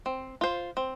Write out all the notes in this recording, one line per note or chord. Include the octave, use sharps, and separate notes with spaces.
C4
F4 C5
C4